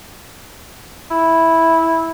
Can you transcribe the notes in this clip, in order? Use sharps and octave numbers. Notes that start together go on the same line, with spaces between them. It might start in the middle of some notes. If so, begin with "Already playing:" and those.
E4